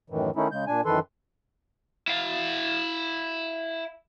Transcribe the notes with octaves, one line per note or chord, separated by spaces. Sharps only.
F#2 A2 D#3 E3
D#3 A3 C#4 D#4 E4
C#3 G#3 G6
A#2 D4 G#5
F#2 D#3 E3 A4 B4 C6
E4 F5